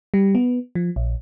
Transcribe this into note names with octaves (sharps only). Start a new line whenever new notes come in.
G3
B3
F3
A#1